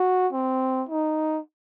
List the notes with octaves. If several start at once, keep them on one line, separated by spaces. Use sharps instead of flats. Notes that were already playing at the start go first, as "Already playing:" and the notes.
Already playing: F#4
C4
D#4